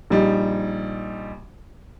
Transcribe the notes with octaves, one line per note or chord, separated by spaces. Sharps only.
A#1 G3 D#4